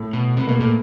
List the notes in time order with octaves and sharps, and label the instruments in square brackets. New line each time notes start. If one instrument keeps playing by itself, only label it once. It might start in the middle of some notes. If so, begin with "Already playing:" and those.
Already playing: [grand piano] A2 A3
[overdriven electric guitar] B2
[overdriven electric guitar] C3 [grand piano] B3
[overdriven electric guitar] B2 [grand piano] A#3
[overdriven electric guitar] A#2 [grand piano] A3